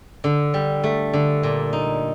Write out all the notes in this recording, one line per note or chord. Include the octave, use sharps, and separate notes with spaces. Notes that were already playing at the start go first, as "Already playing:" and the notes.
D3
G3
A3
D3
A#2
D#4